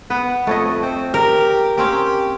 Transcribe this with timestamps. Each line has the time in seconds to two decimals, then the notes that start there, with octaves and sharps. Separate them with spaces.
0.10 B3 B4
0.47 F2 A3 C#5 D#5
0.83 C4
1.14 G4 A#4
1.77 A#3 C4 C#4 G4